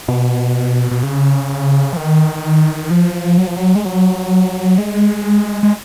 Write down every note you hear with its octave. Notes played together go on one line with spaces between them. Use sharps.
B2
B2
C#3
F3
D#3
F3
F#3
F3
F#3
G#3
F#3
G#3
G#3